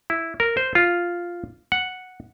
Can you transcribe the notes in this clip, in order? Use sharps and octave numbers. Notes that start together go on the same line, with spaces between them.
E4
A#4
C5
F4
F#5